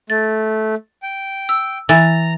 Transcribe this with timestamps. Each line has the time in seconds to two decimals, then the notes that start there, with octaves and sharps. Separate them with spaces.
0.10 A3 A6
1.03 G5
1.49 E6
1.89 E3 A#5 A6